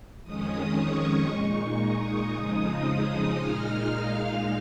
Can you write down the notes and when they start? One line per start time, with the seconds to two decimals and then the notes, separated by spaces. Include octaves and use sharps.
0.23 F2 D#3 G#3 C#4 D#6
0.75 C#6
1.27 A#2 G#3 D#4 C#6
1.79 D#6
2.31 F2 C#3 F3 G#3 D#4
2.82 D#6
3.34 A#2 G#3 D#4 F6
3.86 F5